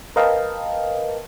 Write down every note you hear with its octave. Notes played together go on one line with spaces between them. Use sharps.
A#4 B4 D#5 F5 G5 A5